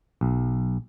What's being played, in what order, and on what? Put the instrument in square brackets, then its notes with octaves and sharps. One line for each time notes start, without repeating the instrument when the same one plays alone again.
[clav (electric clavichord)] B1